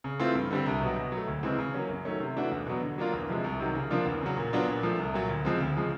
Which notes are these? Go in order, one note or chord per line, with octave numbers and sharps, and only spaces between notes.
C#3
E3 A3 C4 F4
G2
D3 G3 C4
C2
B2 F#3
B2
F#3
A3
D2
C#3 E3 G#3 C4
C#3
F#3 A#3 C#4
F#2
D#3 F#3 A3 C#4
C3
E3 A3 D4 F#4
E2
B2 F#3 B3
D3
F#3 A#3 D4 F4
E2
C3 F3 G#3
C2
C3 D#3 F#3
C#3
F3 A#3 D4 F4
E2
C#3 F#3
A#2
F#3 B3 D4 F4
A#2
F3 A3
C2
A#2 F#3
D2
C#3 F3 G#3 C4
D2
C#3 F3 G#3